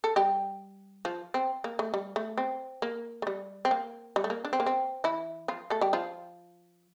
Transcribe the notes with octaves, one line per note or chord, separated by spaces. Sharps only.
A4
G3 G4
F3 F4
C4
A#3
A3
G3
A3
C4
A#3
A3
G3
C4
A#3
G3
A3
A#3
D4
C4
A#3
C4
E3 E4
F3 F4
A3 A4
G3 G4
F3 F4